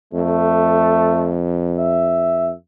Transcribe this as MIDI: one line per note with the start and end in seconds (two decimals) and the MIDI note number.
0.13 2.53 41
0.13 1.38 57
1.79 2.52 76